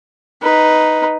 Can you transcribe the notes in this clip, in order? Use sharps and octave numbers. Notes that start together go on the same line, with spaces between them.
D#4 B4